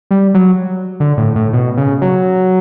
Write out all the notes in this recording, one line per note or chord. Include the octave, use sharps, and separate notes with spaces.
G3
F#3
D3
A2
A2
B2
C#3
F#3